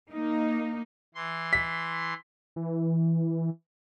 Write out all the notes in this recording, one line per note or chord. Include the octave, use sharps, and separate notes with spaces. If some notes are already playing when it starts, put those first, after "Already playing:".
A#3 D#4
E3 C6
B6
E3